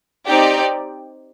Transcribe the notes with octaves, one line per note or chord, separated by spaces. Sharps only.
C4 D#4 G4 D5 G5